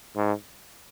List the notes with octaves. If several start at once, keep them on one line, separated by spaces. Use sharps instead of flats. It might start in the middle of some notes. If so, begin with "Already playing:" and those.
G#2